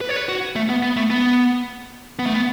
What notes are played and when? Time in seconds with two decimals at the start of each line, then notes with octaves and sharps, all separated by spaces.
0.01 B4
0.09 C#5
0.16 B4
0.29 F#4
0.56 A3
0.69 B3
0.83 B3
0.97 A3
1.10 B3
2.19 B3
2.26 A3
2.34 B3